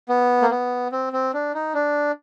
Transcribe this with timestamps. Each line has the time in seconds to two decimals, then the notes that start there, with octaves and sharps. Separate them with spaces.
0.09 B3
0.42 A#3
0.51 B3
0.92 C4
1.13 C4
1.34 D4
1.54 D#4
1.74 D4